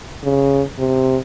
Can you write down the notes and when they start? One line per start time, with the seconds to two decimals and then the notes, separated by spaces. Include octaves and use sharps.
0.23 C#3
0.79 C3